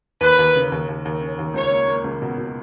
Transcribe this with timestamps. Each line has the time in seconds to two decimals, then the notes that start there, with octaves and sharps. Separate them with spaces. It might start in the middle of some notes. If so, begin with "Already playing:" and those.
0.21 D#2 B4
0.39 D#2
0.55 C#3
0.72 D#2
0.89 D#2
1.05 D#2
1.21 C#4
1.39 D#2
1.54 C#2 C#5
1.71 A#3
1.88 A#3
2.04 C#2
2.22 B2
2.38 B2